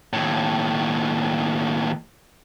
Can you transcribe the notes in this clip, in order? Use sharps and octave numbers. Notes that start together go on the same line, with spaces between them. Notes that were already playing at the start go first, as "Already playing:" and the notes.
D#2 A2